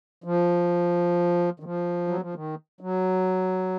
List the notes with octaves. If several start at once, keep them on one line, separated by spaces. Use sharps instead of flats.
F3
D#3
F3
F#3
F3
D#3
F#3